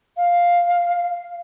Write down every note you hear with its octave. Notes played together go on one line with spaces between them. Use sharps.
F5